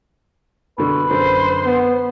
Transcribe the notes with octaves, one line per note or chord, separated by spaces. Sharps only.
B2 D3 B4
F#2 D3 C5
B3